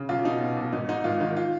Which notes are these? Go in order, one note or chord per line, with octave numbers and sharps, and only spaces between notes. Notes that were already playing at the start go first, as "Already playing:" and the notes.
Already playing: C#3
B1 F4
B2 D#4
B2
B1
G#1 D#4
G#2 D#4
G#1 F4
D#3 D#4
F4